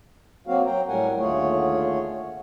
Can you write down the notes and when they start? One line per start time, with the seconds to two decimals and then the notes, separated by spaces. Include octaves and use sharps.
0.47 F#3 A#3 C4 F#4 F5
0.66 F#3 G5 A#5
0.88 A2 F#3 G3 A#4 F#5 G#5
1.20 D#2 D3 A3 F4 G#4 C#5